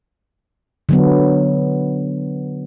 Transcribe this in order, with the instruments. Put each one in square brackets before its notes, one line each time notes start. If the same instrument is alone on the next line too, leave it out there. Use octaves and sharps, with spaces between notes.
[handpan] D3 F#3 B3